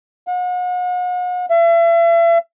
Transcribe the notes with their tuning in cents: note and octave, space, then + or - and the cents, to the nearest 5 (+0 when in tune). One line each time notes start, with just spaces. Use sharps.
F#5 -40
E5 +40